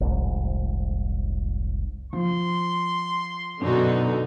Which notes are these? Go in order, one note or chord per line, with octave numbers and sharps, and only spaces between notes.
F1 C2 G#2
F3 C6
F#2 B2 D3 D#4 F#4